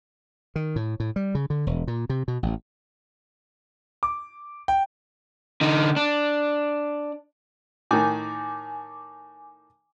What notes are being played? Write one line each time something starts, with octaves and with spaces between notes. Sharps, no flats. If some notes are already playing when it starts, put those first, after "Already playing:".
D#3
A2
A2
G3
C#3
D3
E1
A#2
C3
B2
A1
D6
G5
D3 D#4
D4
A2 D#3 G#5 D6